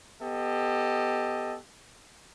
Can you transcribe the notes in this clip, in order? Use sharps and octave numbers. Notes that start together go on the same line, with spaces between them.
B3 G4 A4 D#5